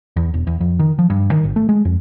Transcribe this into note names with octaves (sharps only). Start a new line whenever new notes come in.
E2
E1
E2
F2
D#3
F3
G2
D#3
G#1
A3
G#3
F2